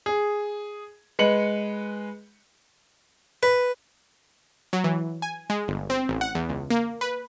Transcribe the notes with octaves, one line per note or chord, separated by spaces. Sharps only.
G#4
G#3 B4 C#7 F#7
B4
F#3
E3
G#5
G#3
G1
C4
A1
F#5
E2
C#2
A#3
B4